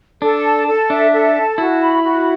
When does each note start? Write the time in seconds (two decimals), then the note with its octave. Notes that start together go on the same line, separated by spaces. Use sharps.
0.22 D4 A4
0.44 A5
0.67 A4
0.90 D4 E5
1.13 A4
1.35 A5
1.58 E4 F#4
1.81 B5
2.03 F#4